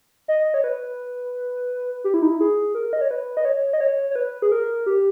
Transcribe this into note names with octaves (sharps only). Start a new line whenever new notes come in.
D#5
C#5
B4
G4
E4
D#4
E4
G#4
A#4
D#5
C#5
B4
D#5
C#5
D#5
C#5
C#5
B4
G#4
A#4
G4